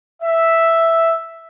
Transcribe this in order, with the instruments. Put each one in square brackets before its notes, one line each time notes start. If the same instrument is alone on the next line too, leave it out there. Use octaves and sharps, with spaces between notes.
[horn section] E5